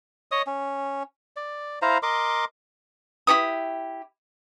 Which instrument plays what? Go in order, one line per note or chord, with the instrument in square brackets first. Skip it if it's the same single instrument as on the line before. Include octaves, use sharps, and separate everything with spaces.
[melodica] C#5 D#5 D#6
C#4
D5
E4 C5 F5 A#5
A#4 D#5 C6 D6
[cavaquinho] E4 G4 C#5 D#6